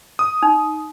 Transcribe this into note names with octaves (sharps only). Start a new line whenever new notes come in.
D#6
D#4